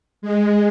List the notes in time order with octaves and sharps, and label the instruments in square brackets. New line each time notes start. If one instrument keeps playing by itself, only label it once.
[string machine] G#3